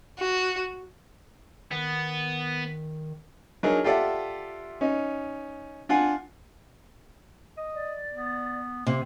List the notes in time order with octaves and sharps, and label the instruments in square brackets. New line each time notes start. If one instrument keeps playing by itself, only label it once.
[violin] F#4
[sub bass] D#3 [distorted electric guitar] B3
[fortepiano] F#3 D4 D#4 G#4 A#4
F4 G4 A4 D5 E5 F#5
C#4 D#4
D4 F4 F#5 G#5
[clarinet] D#5
[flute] D5
[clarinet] B3
[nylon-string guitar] C3 [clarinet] A#3